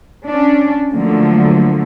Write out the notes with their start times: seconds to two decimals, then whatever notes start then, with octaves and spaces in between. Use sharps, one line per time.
0.24 C#4 D4
0.92 D3 F3 F#3 A3 A#3